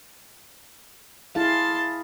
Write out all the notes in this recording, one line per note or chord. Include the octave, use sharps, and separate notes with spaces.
E4 G#4 F5 A5 C6